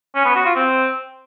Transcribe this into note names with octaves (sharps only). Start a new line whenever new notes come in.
C#4
B3
F#4
F4
C4